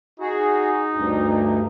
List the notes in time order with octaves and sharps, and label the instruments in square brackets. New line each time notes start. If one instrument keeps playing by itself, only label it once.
[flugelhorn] D#4 [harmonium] F#4 G#4
[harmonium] D2 G2